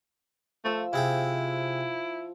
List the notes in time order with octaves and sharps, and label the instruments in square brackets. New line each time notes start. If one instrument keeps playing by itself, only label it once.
[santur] F3 E6 [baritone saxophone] A3
[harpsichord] C3 G#4 G5 [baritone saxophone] E4